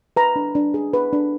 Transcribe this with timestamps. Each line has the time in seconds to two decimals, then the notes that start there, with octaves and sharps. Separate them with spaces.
0.17 B4 A#5
0.36 D4
0.55 D4
0.74 G#4
0.94 B4
1.13 D4